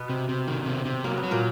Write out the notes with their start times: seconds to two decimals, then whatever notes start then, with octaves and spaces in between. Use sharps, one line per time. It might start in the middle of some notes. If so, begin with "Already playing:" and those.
Already playing: B2 B3
0.09 C3
0.29 C3
0.48 D#3
0.66 C3
0.85 C3
1.04 F#3 A#3
1.17 B3
1.23 F#3
1.31 A#2 A#3